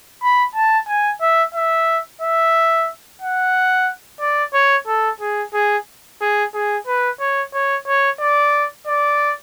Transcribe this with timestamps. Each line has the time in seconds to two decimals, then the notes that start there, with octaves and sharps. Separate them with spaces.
0.22 B5
0.55 A5
0.88 G#5
1.21 E5
1.54 E5
2.21 E5
3.21 F#5
4.20 D5
4.54 C#5
4.87 A4
5.20 G#4
5.54 G#4
6.21 G#4
6.54 G#4
6.87 B4
7.20 C#5
7.54 C#5
7.87 C#5
8.20 D5
8.87 D5